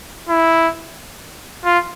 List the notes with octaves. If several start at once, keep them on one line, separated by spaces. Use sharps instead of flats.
E4
F4